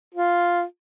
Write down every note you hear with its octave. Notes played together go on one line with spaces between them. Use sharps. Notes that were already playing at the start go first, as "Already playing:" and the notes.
F4